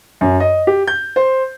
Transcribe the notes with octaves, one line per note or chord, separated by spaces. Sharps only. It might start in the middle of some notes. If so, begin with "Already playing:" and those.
F#2
D#5
G4
G6
C5